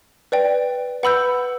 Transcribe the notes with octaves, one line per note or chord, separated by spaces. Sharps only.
B4 D5 G5
B4 F#5 B5 E6 G6